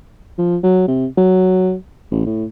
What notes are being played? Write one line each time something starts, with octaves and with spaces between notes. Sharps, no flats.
F3
F#3
C3
F#3
A1
A2